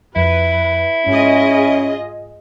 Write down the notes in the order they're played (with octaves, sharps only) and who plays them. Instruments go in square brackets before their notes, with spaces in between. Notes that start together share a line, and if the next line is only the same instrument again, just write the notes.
[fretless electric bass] F2 [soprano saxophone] E4 [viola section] B4
[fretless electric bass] G#2 [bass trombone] C#4 [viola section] F4 G#4 D#5